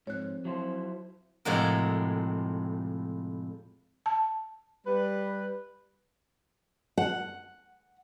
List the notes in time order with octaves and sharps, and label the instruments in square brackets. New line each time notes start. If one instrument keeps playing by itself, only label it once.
[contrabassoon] F2 [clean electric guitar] G#2 [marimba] C#5 F#6
[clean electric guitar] F#3 E4 C5
[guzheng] F2 A2 C3 G#3 F#4 A#4
[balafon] A5
[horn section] G3 B4
[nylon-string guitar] F#5